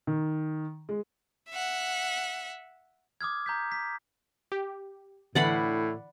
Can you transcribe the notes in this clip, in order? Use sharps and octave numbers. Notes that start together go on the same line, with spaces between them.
D#3
G#3
E5 F#5
D6 D#6 F6 G#6
A#5 G6 B6
B6
G4
A2 D3 E3 D5 F#5 B5 C7